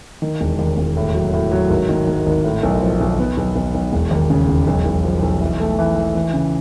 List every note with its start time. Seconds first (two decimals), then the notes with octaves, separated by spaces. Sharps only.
0.22 D#3
0.41 E1
0.59 D#2
0.77 E1
0.97 A2
1.15 F#3
1.33 A2
1.51 F#3
1.70 G#1
1.89 D#3
2.07 D#3
2.26 G#1
2.44 A2
2.63 B1
2.81 F3
3.01 B1
3.19 B3
3.37 B1
3.55 B1
3.74 B1
3.93 E1
4.11 D#2
4.30 C#3
4.48 E1
4.67 B1
4.85 B1
5.04 F3
5.22 B1
5.41 E3
5.60 A3
5.79 E3
5.96 E3
6.15 E3
6.33 C#3